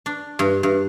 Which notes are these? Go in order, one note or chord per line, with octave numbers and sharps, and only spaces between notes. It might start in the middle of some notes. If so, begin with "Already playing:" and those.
D4
G2
G2